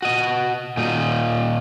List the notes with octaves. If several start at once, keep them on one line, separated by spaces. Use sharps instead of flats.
F#4 D#5
A#2 D#4